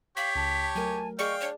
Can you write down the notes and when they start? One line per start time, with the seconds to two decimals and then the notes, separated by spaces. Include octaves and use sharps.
0.17 G4 C#5 F5 B6
0.35 C#2 A5
0.75 F#3 A3 A#4 G#5
1.19 G#4 D5 D#5 F5 G5 C#6
1.41 D4 C#5